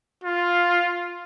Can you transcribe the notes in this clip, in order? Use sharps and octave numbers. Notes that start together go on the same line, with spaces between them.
F4